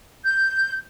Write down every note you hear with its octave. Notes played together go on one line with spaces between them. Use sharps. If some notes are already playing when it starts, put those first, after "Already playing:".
G6